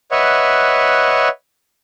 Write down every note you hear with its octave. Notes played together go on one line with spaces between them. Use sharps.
B4 C#5 D#5 E5 F#5